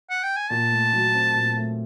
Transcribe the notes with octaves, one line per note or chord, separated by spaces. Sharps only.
F#5
G5
G#5
A#2 A5
A3
F#3
C4
A#2
A3